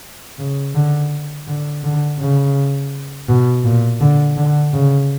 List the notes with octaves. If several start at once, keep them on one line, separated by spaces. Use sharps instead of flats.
C#3
D3
D3
D3
C#3
B2
A#2
D3
D3
C#3